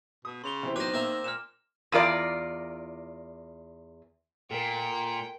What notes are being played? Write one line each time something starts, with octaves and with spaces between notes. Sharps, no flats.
B2 D#6
C#3 C6 F7 G7
C3 E3 C4
D#3 F#3 C4 B4 C5 D6 A#6
A#3 C4 E5 A#5 D6
A#2 F6 E7
E2 F4 A#4 D5
A#2 A4 A#4 G5